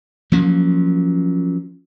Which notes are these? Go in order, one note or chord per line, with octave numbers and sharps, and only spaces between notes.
F3 F#3 A#3 C#4